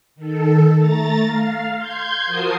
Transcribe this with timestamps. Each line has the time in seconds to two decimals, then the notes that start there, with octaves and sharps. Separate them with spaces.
0.16 D#3 A4
0.78 A3 A#5 A6
1.24 F5
1.78 C6 G6 G#6
2.26 F3 F#4 A#4 A5 D#6 C7